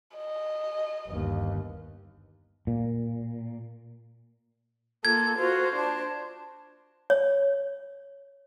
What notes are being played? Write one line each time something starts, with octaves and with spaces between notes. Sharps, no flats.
D#5
G1 D#2
A#2
A#3 F4 A4 G#6
F4 F#4 C5
D4 A5
C#5